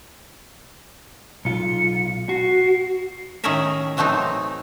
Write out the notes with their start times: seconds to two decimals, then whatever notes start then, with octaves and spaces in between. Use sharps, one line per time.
1.45 B1 F4 C#7
2.29 F#4 C7
3.44 A2 D#3 C#4 G#4 A#4 E5
3.97 E3 F#3 A3 C4 D#4